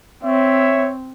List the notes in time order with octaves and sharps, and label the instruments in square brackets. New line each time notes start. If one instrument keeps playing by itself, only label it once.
[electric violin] C4 [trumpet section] C#5 E5